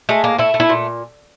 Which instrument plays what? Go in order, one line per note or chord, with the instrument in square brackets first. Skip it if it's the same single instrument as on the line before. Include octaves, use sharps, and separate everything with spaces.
[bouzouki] G#3 A3
A2 A#3
A3 E4
A3
E4
A#2